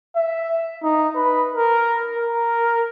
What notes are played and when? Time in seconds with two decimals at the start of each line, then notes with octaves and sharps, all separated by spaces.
0.16 E5
0.83 D#4
1.15 B4
1.55 A#4
2.17 A#4